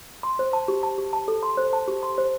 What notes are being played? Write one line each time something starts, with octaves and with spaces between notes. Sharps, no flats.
C6
C5
A5
G4
A5
G4
A5
A4
C6
C5
A5
G4
C6
C5